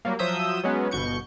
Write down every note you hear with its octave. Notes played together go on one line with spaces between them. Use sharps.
F#3 G3 A#3
F3 F#3 E5 D#6 E6 G6
F#3 G#3 B3 C#4
G1 B2 C#6 G6 C#7